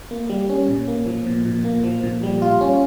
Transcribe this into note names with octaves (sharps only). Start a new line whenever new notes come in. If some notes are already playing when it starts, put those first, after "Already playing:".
A#3
G3
C#4
A#2
A#3
F3
A#2
A#2
A#3
F3
A#2
G3
F4
C#4